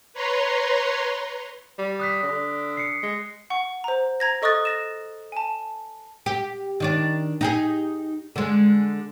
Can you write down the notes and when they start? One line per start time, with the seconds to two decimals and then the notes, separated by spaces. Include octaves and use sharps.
0.13 B4 C#5 A#5 C6
1.79 G3
1.99 D#6 F#6 B6
2.23 D3
2.77 C7 C#7
3.03 G#3
3.50 F#5 C#6
3.84 C5 A#5
4.20 A#5 G#6 A#6
4.42 A4 D#5 C#6 D#6 F#6 A6
4.65 A6 A#6 E7
5.32 G#5 A5
6.26 G4
6.80 D#3 D4 D5
7.41 D#4 G4 G#4
8.36 D3 G#3